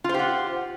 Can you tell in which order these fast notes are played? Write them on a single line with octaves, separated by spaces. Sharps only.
F4 C5 G4 F#5